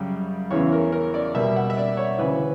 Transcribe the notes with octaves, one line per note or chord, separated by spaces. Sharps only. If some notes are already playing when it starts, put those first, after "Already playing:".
Already playing: F#2 C#3 G3
E2 C#3 E3 B3 C#5
A#4
A#4
D5
B2 G3 A#3 E5
F#5
E5
D5
C#5
D2 C#3 E3 B4